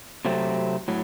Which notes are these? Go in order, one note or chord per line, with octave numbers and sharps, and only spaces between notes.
C3 F#3 A3 C4
A2 F#3